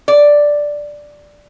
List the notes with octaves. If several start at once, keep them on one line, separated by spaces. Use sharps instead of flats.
D5